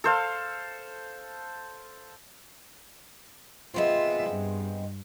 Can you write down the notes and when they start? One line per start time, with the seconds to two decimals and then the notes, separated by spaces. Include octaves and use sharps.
0.04 A4 C5 F5
3.74 G#3 B3 C4 F4 E5
4.30 G2